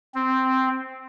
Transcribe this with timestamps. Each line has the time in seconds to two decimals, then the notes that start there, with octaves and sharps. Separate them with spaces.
0.15 C4